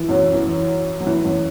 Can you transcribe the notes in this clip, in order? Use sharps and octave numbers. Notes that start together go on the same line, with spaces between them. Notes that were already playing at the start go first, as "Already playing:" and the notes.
Already playing: E3
F#2 F#3
E3
F#3
E3
F#2 F#3